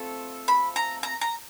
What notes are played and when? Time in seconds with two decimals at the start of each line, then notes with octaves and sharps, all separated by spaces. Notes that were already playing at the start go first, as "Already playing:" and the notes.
Already playing: A3 C4 F4 A4
0.48 B5
0.76 A#5
1.03 A#5
1.21 A#5